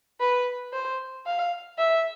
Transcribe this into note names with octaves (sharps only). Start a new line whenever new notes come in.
B4
C5
F5
E5